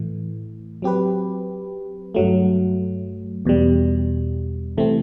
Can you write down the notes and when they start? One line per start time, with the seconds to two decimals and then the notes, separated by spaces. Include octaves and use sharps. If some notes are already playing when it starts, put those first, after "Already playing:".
Already playing: A2 E3 A3
0.82 F#3 C4 G4 B4
2.15 G2 F#3 A3
3.45 E2 B2 G3
4.77 C3 E3 A3 C4